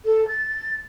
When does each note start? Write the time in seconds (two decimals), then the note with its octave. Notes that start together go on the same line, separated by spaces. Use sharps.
0.05 A4
0.28 A6